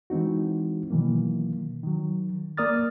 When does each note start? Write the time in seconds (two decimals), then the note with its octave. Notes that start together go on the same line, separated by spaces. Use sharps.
0.10 E3 G#3 C4 D#4 F#4
0.90 B2 D#3 E3 F#3 A#3
1.83 D#3 F#3
2.57 A#3 A#4 D5 D#6 F6 A6